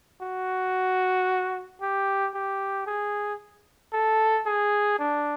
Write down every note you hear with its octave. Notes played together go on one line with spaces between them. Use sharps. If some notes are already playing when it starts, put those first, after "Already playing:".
F#4
G4
G4
G#4
A4
G#4
D4